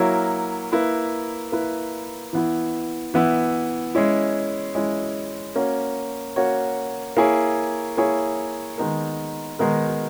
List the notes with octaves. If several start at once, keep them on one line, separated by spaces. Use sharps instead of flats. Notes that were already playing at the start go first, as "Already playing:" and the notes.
Already playing: F#3 A#3 E4 A#4 C#5
A#3 E4 B4
A#3 E4 B4
E3 B3 E4
E3 B3 E4
G#3 C#4 E4
G#3 C#4 E4
A#3 C#4 F#4 C#5
A#3 C#4 F#4 C#5
A#3 E4 G#4 C#5
A#3 E4 G#4 C#5
D#3 G#3 B3 D#4 A#4
D#3 G#3 B3 D#4 A#4